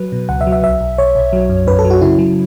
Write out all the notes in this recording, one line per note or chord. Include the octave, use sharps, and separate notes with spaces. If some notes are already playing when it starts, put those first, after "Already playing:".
Already playing: F#3 B4
B2
C#2 F#5
E5
F#3
E5
B1 E5
B1
B1 C#5
B1
F#3
F#2
F#2 B4
A4
F#3
F#4
C#3 E4
F#3